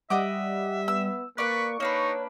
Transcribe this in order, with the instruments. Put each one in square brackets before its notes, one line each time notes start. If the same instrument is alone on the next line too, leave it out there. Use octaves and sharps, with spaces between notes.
[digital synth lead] G3 [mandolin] D#5 F#5 D6 [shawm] E5
[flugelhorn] B3 [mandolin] E6
[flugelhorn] A#3 [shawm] B4 [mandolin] D5 F#6 [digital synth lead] C#6
[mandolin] A#3 D4 B4 [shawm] D#4 [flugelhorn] C#5